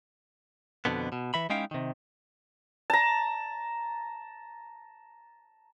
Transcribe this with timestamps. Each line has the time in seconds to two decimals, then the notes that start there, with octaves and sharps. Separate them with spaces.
0.85 F2 B2 D3 B3
1.12 B2
1.34 E3 E5 B5
1.50 G#3 C#4 D#4 E4 F5 G5
1.71 C3 D#3
2.90 A5 A#5